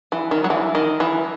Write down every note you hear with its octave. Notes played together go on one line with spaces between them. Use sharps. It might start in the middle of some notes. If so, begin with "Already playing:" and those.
E3
D#3
F#3
E3
D#3
E3